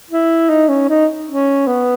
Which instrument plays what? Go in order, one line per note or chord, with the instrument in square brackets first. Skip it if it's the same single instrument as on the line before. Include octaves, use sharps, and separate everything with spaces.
[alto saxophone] E4
D#4
C#4
D#4
C#4
B3